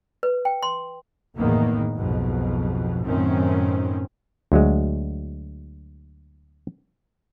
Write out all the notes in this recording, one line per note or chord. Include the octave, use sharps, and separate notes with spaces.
B4
G5
C6
F#1 E2 A2 D#3 A#3 B3
B1 F2 G#2 B2
F#2 A2 D#3 C4 C#4
D2 F#3 G#3